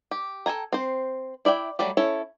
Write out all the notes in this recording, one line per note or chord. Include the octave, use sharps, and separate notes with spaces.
G4
A4 G5 G#5 A#5
C4 C5
E4 D5 E5 G5
F#3 G3 A3 G4
C#4 E4 A4 C#5